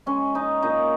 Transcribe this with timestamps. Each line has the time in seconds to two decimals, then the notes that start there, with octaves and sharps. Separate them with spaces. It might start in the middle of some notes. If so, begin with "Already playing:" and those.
0.06 G#3 C#4
0.34 C#4 D#4
0.63 A#2 D#4